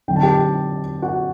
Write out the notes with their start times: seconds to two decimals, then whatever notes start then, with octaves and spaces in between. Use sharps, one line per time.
0.08 D3 F#3 C4 D#4 G5
0.16 A5
0.23 G4 G5
1.02 F#4 F#5